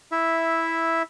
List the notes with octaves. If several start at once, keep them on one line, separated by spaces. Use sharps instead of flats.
E4 E5